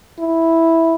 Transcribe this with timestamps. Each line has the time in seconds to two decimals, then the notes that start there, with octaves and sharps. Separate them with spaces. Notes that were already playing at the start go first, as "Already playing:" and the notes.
0.19 E4